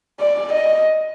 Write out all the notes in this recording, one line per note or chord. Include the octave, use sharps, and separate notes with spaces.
D5
D#5